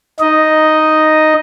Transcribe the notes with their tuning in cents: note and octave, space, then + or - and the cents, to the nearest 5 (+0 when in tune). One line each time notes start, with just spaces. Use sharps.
D#4 +0 D#5 +0